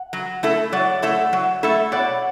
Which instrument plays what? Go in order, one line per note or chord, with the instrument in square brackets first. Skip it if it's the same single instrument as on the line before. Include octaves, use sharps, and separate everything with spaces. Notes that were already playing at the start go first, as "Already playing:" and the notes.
Already playing: [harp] F#5
[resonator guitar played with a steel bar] F#3
A3 E4 A4
[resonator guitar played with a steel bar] F#3 [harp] D5 F#5
[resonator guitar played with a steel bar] A3 E4 A4
F#3
A3 E4 A4
[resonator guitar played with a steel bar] B2 [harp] D5 F#5